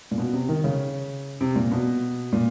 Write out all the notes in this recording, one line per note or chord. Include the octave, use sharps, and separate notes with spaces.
A#2
B2
C3
D#3
C#3
C3
A#2
B2
A#2